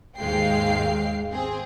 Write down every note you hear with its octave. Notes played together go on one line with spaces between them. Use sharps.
D#2 G#2 G#3 F5 G5 C7
C4 G#4